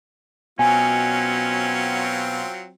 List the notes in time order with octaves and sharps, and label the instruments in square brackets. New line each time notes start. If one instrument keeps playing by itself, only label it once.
[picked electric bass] B2 [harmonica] F#3 C4 F4 [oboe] C#4 [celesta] G#5